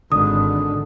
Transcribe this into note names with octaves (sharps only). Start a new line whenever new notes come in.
G#1 D3 D#6